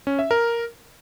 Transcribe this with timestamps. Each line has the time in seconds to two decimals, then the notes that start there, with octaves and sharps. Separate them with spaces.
0.07 C#4
0.19 E5
0.31 A#4